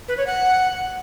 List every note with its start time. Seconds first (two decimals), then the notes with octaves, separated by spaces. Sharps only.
0.08 B4
0.17 C#5
0.27 F#5